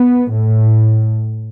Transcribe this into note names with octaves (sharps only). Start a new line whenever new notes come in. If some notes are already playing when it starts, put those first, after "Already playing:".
Already playing: B3
A2